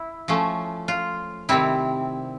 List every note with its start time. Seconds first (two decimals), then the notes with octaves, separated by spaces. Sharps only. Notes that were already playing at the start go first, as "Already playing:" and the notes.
Already playing: E4
0.28 F3 A3 C#4
0.88 F4
1.49 C3 D#3 G3 C4 E4